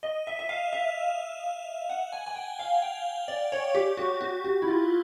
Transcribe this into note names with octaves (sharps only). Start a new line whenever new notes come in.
D#5
E5
E5
F5
E5
F#5
G#5
G#5
G5
F5
G5
D5
C#5
G4
F#4
F#4
F#4
E4
F4